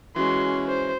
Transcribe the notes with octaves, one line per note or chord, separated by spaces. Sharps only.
E3 G#3 C#4 F#4 C6
C5